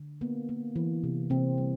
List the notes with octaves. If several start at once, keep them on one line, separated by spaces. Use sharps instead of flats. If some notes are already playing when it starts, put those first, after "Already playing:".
Already playing: D3
A#3 B3
A#3
E3
C3
C3 A#3 C4
G3